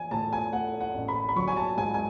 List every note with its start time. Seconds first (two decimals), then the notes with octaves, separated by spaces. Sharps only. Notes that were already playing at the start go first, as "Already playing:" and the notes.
Already playing: E3 G#5
0.11 A2 A5
0.33 G#5
0.53 A3 F#5
0.80 F#5
0.94 A1
1.08 B5
1.29 B5
1.36 F#3 C#6
1.48 G#5
1.57 A5
1.77 G#2 G#5
1.94 G#5